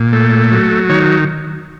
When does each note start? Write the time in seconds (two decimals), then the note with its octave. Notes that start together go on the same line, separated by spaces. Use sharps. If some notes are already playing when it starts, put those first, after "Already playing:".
Already playing: A#2
0.13 A3
0.52 F#3
0.89 D#3 C#5